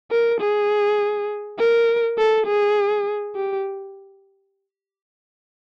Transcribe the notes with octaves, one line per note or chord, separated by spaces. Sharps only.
A#4
G#4
A#4
A4
G#4
G4